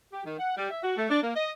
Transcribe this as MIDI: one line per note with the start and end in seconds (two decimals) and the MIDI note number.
0.12 0.24 67
0.25 0.36 51
0.39 0.53 78
0.57 0.68 55
0.71 0.79 76
0.83 0.93 66
0.97 1.06 57
1.10 1.19 62
1.22 1.36 58
1.36 1.50 75